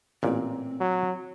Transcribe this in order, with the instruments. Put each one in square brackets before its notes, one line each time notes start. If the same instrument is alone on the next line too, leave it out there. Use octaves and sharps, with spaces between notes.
[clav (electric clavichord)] A1 A#2 [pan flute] C4
[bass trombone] F#3